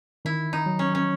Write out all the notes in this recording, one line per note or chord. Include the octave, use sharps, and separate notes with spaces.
D#3 E4
D#4
F#3
C#4
C#4